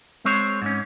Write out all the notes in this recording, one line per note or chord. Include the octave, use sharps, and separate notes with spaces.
G#3 C4 C5 C#5
G#2 C#4